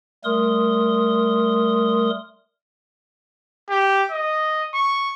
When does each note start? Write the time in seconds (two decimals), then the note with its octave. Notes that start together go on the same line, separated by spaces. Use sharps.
0.24 G3 A3 A#4 C6 D#6
3.69 G4
4.11 D#5
4.74 C#6